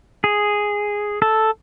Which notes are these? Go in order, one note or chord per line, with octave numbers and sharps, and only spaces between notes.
G#4
A4